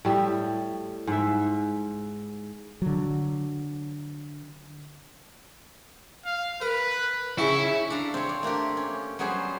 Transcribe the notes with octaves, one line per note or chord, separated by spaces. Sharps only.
A2 G3 E5
G#2 E5
D3 F#3
F5
A#4 B4
C#3 E4 G5 C#6
D4 A4 F5 A#5
C4 C#5
D5
A3 A#3 D4 G4
C#4
F#3 G3 B3 C#4 G#4 C5